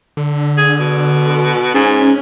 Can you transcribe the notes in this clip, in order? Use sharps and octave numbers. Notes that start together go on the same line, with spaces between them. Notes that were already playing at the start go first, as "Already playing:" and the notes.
D3
G#4
B2
G#2 C#4